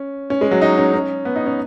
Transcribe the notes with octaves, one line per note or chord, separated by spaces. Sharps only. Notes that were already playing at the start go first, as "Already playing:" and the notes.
Already playing: C#4
C#4
G#3
F#3
D#4
C#4
C#4
B3
D#4
C#4